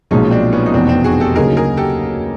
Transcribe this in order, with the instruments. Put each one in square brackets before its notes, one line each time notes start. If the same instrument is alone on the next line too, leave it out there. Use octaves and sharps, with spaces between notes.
[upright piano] B1 A#2 F3 G#3 [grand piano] C#4 D#4
[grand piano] C4 D4
B3 C#4
D#4
[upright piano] F1 E2 B2 [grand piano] C4 D4
[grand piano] C4 D4
F#4 G#4
G4 A4
[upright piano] D2 C#3 F#3 A#3 D#4 [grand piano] G#4 A#4
[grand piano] G#4 A#4
G4 A4